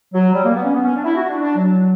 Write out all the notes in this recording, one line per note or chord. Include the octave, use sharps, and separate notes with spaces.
F#3
G3
A#3
B3
C#4
B3
C#4
D4
E4
F#4
D4
D4
F#3